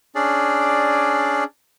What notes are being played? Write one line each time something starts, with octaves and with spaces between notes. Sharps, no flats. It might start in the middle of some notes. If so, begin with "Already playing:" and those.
C#4 D4 G#4 D5